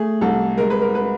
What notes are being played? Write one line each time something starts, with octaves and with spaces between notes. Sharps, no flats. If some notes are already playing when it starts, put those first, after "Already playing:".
Already playing: A3 G#4
C2 A4
G#3 A#4
B4
A#4
B4